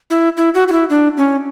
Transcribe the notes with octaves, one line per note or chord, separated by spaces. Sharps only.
E4
E4
F#4
F#4
E4
D4
C#4